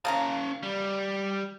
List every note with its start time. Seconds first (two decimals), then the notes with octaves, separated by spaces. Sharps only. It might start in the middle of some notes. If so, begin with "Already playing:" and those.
0.05 C#3 A#3 C#4 A5 A#5
0.63 G3